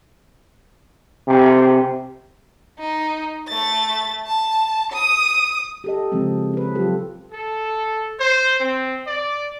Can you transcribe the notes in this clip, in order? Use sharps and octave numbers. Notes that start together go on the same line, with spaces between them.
C3
D#4
A3 A6
A5
D#6
G4 A4 D#5
C#3 E3 F3 G#3 C4
C#4 B4
F#3 F4 G4 A4
A4
C5
C4
D5